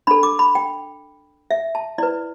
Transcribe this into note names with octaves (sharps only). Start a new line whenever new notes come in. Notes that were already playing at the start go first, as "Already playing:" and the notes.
D4 A4 B5
D6
B5
G5
E5
A5
E4 B4 D5